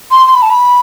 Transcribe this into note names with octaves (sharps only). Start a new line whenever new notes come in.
C6
C6
B5
A5
B5